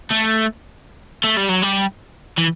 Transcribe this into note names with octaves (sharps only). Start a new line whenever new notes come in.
A3
A3
G3
F#3
G3
E3